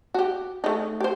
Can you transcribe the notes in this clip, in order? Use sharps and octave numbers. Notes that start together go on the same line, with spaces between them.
F#4 G4
A3 D#4
G4 C5